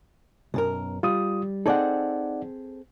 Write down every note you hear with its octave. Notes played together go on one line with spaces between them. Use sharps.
B1 F#2 A#4
G3 F4 D#6
C4 D#4 G#4 A4 D5 F#5